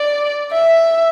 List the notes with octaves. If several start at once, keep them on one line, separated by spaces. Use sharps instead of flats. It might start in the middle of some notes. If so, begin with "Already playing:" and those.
Already playing: D5
E5